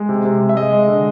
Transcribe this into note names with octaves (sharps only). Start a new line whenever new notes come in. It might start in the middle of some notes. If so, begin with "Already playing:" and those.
Already playing: G#3
C3
C3
G#3
E5
G#3 D#5
G#3
D3